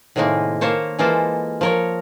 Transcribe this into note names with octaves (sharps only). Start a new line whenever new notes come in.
A2 C3 D#3 G#3 A#3
A#3 C5 C#5 A5
E3 G#3 A#3 F4 A4 C5
F3 A#4 C#5